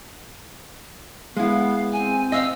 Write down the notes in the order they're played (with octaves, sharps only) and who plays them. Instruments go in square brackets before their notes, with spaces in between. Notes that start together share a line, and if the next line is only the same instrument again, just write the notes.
[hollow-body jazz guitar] G#3 E4 [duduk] B3 [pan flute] F5
[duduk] C4 [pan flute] G#5
[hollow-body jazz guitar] D#5 F5 [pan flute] E6